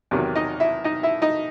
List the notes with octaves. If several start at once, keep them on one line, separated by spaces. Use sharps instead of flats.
E2 C3 D#3 F#3
D#4 D#5
E4 E5
D#4 D#5
E4 E5
D#4 D#5